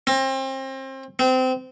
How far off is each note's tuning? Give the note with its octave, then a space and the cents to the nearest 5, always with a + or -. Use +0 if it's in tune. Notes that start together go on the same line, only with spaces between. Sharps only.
C4 +30
C4 -25